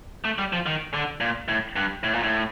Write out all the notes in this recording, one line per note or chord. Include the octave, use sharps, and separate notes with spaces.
A3
G3
F3
D#3
D3
A#2
A2
G2
A2
A#2
A2